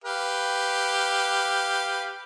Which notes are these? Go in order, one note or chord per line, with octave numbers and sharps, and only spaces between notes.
G4 B4 F5